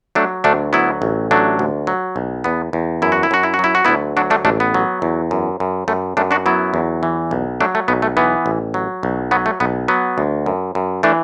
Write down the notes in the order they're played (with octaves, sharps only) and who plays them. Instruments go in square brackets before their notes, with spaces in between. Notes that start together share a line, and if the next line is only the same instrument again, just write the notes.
[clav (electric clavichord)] F#3 A3 D4
D2 A3 D4
F#3 B3 E4
A1
F#3 A3 D4
D2
F#3
B1
E2 B3
E2
F#2 E4
F#4
E4
F#2 F#4
E4
F#4
F#3 E4
F#4
D2 B3 E4
F#3 D4 F#4
A3 D4
A1 A3 D4
B3
F#3
E2
F#2
F#2
F#2 A3
F#2 A3 D4
D4 F#4
F#3 B3 E4
E2
E3
B1
F#3 A3 D4
A3
B1 B3
A3
E3 B3
A1
F#3
B1
F#3 B3
A3
B1 B3
F#3 B3
D2
F#2
F#2
E3 A3 D4